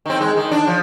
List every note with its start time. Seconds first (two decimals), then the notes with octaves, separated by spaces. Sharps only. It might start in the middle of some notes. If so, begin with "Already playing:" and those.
0.06 D#3 C4
0.21 G#3
0.37 D#3
0.51 D4
0.67 F3